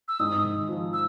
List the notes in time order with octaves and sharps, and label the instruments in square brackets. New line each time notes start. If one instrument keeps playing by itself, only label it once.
[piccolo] E6
[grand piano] G#2 [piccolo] D#6
[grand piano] G#1
F3
[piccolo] E6